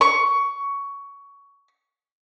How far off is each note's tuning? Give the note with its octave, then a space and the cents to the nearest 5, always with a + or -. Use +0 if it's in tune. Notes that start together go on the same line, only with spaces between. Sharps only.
C#6 +15